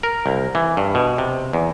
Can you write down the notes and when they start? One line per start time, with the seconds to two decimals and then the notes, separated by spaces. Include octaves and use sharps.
0.03 A#4
0.26 C2
0.55 E3
0.77 G2
0.95 B2
1.18 C3
1.53 E2